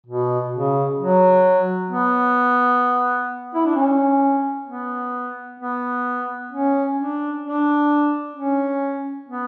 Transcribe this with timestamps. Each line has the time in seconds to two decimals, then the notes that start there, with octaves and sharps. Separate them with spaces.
0.06 B2
0.52 C#3
0.99 F#3
1.91 B3
3.54 E4
3.65 D4
3.75 C#4
4.67 B3
5.60 B3
6.52 C#4
6.98 D4
7.44 D4
8.36 C#4
9.29 B3